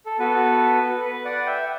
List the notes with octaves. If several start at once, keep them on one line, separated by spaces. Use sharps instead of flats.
A4
B3 F#4 A4 B4
B4
D5 F#5
E5 G5